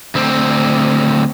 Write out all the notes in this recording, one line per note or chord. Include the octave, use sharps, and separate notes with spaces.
D2 C4